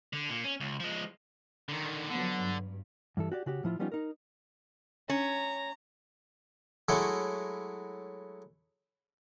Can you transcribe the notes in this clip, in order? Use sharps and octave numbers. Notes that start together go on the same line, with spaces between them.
D3
A#2
C#4
C#2
F3 G#3
D3 D#3
D3 F3 F#3 B3
G2
G2 E3 A4
F#4 G4 D5
C#3 F#4 G4
A2 F3 E4 F4
F3 G3 B3 C#4 D#4 F4
D#4 A#4
C#4 A#5
F#3 G#3 A3 E4 C#5